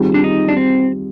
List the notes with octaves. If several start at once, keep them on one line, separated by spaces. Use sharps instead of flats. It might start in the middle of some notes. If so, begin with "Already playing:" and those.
Already playing: D#3 G3 C4 F4 G#4
D4
D#4
D4
C4